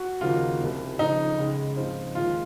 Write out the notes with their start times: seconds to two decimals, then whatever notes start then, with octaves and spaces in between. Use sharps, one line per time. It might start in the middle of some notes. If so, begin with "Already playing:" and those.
Already playing: F#4
0.21 D#2 C#3 F3 A#3 D#4 F4
0.60 C2 C3 D#3
0.99 F2 C#3 F3 D#4
1.38 C#2 C#3 G#3
1.76 G#2 F3 C4 F4
2.15 D#2 D#3 G#3 F4